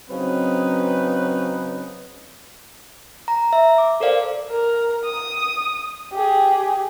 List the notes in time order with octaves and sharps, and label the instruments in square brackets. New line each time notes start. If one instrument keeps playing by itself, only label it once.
[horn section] C#3 F#3 C4 C#4 D#4 B4
[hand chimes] A#5
E5
D6
A4 A#4 C5 D5 F5
[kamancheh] A#4
D#6
G4 G#4